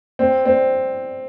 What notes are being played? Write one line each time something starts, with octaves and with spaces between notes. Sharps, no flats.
C4
C4